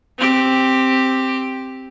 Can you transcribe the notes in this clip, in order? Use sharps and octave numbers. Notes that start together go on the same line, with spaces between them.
C4 G4